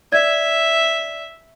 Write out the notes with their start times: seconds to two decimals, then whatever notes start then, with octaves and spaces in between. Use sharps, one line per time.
0.12 D5 E5 G#6